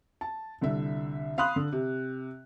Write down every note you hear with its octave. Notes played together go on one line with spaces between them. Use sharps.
A5
C2 D3 E5
F5 B5 C6 D#6 F#6
D3
C3